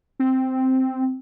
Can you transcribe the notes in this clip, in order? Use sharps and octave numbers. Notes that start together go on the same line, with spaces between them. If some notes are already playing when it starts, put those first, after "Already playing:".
C4